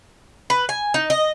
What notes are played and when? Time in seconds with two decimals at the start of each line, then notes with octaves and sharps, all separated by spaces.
0.50 B4
0.69 G#5
0.94 D#4
1.10 D#5